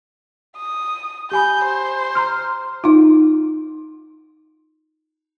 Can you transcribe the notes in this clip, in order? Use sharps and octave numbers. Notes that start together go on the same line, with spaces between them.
D#6
G4 G#5 B5 G6
C5
A#5 C6 F6
D#4 F4